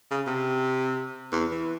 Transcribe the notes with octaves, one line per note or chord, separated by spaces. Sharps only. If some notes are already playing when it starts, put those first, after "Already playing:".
C#3
C3
E2
E3